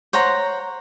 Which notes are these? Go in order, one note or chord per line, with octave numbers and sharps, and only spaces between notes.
C5 C#5 F#5 A#5